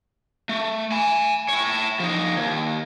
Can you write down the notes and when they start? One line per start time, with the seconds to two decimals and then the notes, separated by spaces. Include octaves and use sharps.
0.49 A3
0.92 G#5 B5
1.49 E4 C#5
2.00 F3 D#4
2.36 D#2